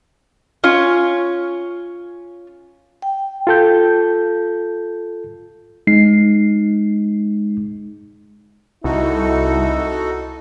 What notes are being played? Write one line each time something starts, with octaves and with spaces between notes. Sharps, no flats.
C#4 F4 C#5
G5
F4 A4 G6
G#3 D#4 C7
C2 D#4 E4 F#4 A4